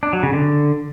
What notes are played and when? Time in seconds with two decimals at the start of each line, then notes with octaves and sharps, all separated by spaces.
0.03 D4
0.13 F#3
0.23 C#3
0.33 D3